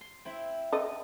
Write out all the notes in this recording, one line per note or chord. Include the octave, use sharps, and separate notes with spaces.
C6
C4 E4 E5
A4 D#5